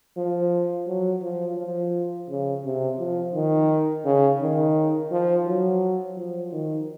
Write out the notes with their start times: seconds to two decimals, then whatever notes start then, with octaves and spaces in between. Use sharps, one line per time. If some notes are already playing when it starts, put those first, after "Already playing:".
0.17 F3
0.87 F#3
1.22 F3
1.57 F3
2.29 C#3
2.64 C3
2.99 F3
3.34 D#3
4.05 C#3
4.41 D#3
5.11 F3
5.47 F#3
6.17 F3
6.52 D#3